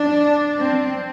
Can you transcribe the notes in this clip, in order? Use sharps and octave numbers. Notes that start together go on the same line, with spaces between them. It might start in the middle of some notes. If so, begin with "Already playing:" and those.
Already playing: D4
C4